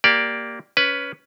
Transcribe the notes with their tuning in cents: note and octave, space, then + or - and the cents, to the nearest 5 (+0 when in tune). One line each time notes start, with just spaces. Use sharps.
A#3 +0 G4 +0 D5 +0
C#4 +15 B4 +0